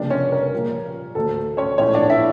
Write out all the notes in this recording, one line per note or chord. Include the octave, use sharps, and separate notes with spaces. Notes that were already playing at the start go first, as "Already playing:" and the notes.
Already playing: F1 F2 C#3 G3 A#3 D4 D5
C#4 C#5
A#4
A#1 A#2 G3 A#3
D2 D3 A3 A4
C#4 C#5
A#1 A2 E3 A3 C#4 C#5
D4 D5
E4 E5